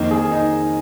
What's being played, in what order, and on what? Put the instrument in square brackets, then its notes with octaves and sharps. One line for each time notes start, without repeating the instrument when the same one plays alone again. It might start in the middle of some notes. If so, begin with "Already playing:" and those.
Already playing: [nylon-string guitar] F2 D#3 A#3 [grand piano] D#4
[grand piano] G#4
D#4